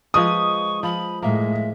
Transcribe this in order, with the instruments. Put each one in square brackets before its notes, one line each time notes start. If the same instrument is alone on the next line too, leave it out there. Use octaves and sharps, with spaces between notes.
[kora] F3 G#3 B4 [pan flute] C#6 [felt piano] D#6
[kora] F3 [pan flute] B5
[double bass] A2 G#3 [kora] A#3 [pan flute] E5